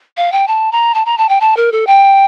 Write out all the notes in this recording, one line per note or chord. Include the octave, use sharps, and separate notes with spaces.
F5
G5
A5
A#5
A5
A#5
A5
G5
A5
A#4
A4
G5